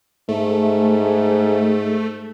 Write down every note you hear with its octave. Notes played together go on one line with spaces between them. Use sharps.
G#2 A3